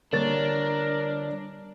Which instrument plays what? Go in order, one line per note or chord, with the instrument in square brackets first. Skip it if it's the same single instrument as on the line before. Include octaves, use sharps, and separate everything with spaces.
[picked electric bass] D3 G3 [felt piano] A#3 C#5 A6 [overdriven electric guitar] D4 [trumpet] A#4